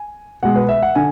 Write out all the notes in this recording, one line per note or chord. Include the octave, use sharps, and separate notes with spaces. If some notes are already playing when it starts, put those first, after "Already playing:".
Already playing: G#5
B2 G#3 F#5
B4
E5
F#5
D3 G#5